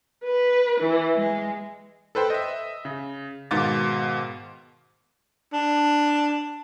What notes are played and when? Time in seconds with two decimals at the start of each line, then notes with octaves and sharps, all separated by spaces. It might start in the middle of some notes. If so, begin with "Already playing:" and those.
0.24 B4
0.80 E3
1.15 G#3
2.15 A4 B4 C5 G5
2.30 D#5 E5
2.85 C#3
3.51 G#2 B2 D#3 F5 D6 A6
5.53 D4